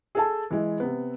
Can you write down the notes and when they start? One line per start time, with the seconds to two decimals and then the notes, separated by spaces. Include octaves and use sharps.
0.15 G#4 A4 A5
0.50 E3 G#3
0.80 C3 B3